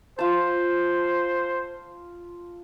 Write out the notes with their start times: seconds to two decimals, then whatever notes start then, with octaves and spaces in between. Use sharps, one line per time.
0.19 F4 C5 A5